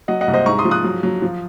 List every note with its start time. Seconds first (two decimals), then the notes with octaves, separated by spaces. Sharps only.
0.08 F#3 D#5 F#5
0.21 D#5 F#5
0.27 C2
0.34 C5 D#5
0.46 G#2 A#5 C#6
0.59 C6 D#6
0.65 F3
0.71 D#6 F#6
0.84 F#3
1.03 F#3
1.22 F3